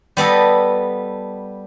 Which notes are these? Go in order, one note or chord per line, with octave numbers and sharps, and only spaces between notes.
G3 B3 A4 D#5